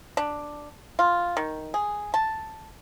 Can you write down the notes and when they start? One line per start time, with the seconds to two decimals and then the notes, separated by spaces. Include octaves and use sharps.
0.17 D4
0.99 F4
1.37 D#3
1.74 G#4
2.14 A5